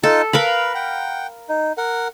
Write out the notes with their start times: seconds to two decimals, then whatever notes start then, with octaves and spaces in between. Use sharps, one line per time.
0.03 D#4 F4 A4 A5
0.33 A#4 B4 F5 B5
0.75 F#5 G5
1.49 D#4
1.77 A#4 F#5